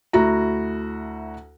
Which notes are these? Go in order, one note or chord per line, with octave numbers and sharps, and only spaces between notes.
D2 E4 F#4 A#5